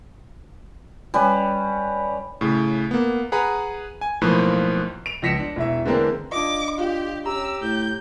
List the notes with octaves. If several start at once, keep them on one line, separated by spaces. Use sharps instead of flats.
G3 C#4 B4
A2 C#3
A#3 B3
G#4 B4 F#5 A#5 B5
G#5
B1 A2 F3 A#3 B4 C5
D7 F7
C#2 F3 A#6 B6 C#7 E7
D4
E1 E4 E5
D3 E3 G#3 A#3 C4 D4
D4 F4 D#5 D6
F4 G4
C#4 G4 A#5 E6
A2 G6